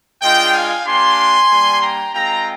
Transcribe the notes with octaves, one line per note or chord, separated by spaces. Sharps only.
G#3 D4 F4 D#5 G5
F5 G#5
A#3 D4 G4 G#5 C6
G3 A#3 D4
G5 A#5
G#3 C4 F4 G5 A#5